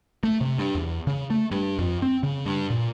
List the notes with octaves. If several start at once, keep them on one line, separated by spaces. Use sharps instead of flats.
A3
C3
G2
E2
C#3
A3
G2
F2
C4
C#3
G2
A#2